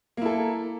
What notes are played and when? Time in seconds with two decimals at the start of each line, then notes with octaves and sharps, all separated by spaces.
0.17 A#3
0.22 E4
0.26 A4